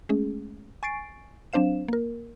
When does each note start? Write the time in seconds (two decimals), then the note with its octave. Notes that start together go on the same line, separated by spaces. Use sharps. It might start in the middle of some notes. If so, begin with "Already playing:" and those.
0.09 G#3 A3 C#4 G#4
0.83 G#5 C#6 A6 C7 D7
1.53 F#3 C4 D4 C5 F5 E7
1.88 A#3 A#4